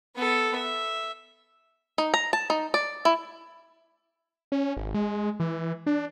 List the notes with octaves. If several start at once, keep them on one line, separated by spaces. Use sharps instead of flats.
B3 A4
E5
D#4
A#5
A5
D#4
D5
E4
C#4
G#1
G#3
E3
D4